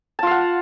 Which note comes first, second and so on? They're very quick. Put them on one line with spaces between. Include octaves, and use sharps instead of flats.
A5 F4 F5 F#5